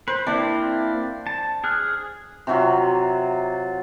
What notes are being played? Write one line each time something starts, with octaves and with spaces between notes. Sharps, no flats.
B4 C5
A#3 C4 D4 E4
A5
G#4 F6 F#6
C3 F#3 F4